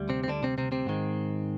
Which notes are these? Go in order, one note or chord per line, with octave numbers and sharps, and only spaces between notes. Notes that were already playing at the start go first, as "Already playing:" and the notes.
Already playing: D2 G3
C3 C4
C4
D3 D4
C3 C4
C3 C4
C3 C4
G#2 D#3 G#3